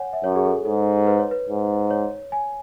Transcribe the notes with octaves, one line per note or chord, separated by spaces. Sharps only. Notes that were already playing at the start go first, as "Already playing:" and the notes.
Already playing: C#5 F#5 G#5
E5
F#2 C#5
G#4
A4
G#2 A4
B4
C#5
B4
G#2
C#5
G#5